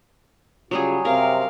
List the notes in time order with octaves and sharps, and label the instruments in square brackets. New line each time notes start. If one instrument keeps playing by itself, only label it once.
[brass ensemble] C#3 F4 F#4 [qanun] F#3 G3 G#4
[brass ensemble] F#2 C3 [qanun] A#4 [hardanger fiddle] F5